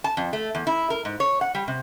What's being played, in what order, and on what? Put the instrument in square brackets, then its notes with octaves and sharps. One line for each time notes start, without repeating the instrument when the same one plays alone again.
[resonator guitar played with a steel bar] A5
F2
A3
E2
E4
A#4
G#2
C#5
F#5
G3
C3